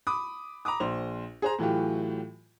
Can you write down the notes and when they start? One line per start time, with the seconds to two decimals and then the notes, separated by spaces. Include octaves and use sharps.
0.07 B5 D6 D#6
0.65 A#5 B5 D6 D#6
0.80 A#1 C5 F7
1.42 G#4 C5 A#5
1.59 A2 E3 F#3 F4 G4